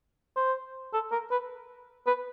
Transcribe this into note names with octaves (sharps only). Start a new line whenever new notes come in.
C5
A4
A#4
B4
B4